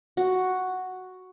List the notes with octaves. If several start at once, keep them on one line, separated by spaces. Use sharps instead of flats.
F#4